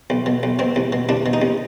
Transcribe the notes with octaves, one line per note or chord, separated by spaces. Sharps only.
B1
B2
B1
B2 C4
C2
B2
C2 D4
B2
D#4
C2